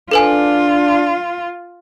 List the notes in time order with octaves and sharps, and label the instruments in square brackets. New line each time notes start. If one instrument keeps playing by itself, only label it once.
[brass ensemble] D4 [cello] F4 [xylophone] A4 B4 G#5